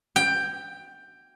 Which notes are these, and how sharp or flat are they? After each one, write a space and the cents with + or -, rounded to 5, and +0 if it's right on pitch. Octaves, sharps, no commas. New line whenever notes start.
G5 +10